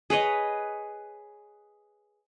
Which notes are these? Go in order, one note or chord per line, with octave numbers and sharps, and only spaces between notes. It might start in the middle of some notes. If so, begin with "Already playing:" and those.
G#4 B4 C#5 D#5